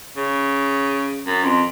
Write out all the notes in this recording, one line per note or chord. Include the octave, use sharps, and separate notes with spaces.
C#3
F#2
F2